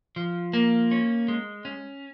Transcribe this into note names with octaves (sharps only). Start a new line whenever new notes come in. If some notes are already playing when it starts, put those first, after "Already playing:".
F3
A#3
C#4
G#3
C#4